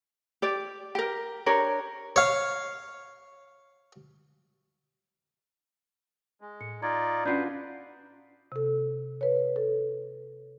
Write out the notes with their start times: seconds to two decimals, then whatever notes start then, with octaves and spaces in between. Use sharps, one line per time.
0.42 G4 D5
0.95 G4 A#4
1.46 D4 G4 A#4 C#5
2.16 C#5 F5
6.41 G#3
6.61 A2 C#7
6.82 D#4 F4 D5 A#5 G#6
7.25 C#4 D4 F4 F#4 B4 D5 G6 C7
8.52 C3 A4
9.21 B4 C#5
9.56 A4